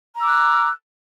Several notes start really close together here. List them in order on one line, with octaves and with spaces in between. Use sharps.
A#5 E6 D6 F#6